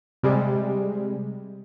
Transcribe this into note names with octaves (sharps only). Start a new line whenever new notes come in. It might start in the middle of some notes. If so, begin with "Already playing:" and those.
C3 G3 G#3